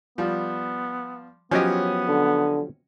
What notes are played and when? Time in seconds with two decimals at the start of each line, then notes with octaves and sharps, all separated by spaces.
0.18 F3 G3 B3
1.51 F3 F#3 B3 C#4 G4 D#5
2.08 D3